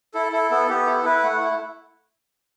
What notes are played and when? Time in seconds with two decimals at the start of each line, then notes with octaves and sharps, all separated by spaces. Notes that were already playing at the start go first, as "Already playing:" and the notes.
0.14 E4 A4
0.32 E4 A4
0.51 B3 A4
0.68 B3 G4
0.86 E4 A4
1.04 E4 B4
1.23 A3 F#5
1.41 E4